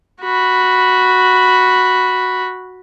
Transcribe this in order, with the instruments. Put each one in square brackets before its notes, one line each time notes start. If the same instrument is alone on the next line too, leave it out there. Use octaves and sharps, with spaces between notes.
[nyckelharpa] F#4 B5